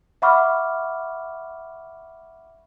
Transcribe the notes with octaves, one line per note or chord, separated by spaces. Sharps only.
E5 F#5 B5 C#6 D6 F6